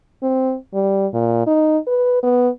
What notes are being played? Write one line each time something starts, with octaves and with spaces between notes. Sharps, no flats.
C4
G3
A#2
D#4
B4
B3